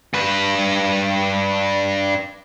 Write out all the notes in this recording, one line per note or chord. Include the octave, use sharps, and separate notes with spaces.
G2 B4